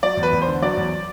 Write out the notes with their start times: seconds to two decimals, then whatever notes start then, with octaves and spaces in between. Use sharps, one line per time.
0.03 F#3 D5
0.17 E2
0.23 B4
0.32 E2
0.42 C5
0.47 D3
0.62 F#3 D5
0.77 E2